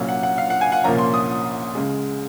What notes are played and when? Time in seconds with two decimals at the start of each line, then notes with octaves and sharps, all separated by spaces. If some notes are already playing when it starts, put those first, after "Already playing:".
Already playing: C2 A#2 F#3 A#3 C#4
0.08 F#5
0.23 F#5
0.38 F5
0.50 F#5
0.61 G#5
0.72 F#5
0.84 C2 A#2 F3 A#3 C#4 A#5
0.98 C6
1.14 D#6
1.75 C#2 C#3 G#3